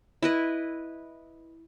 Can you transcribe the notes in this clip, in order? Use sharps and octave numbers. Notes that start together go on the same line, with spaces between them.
E4 B4 D#5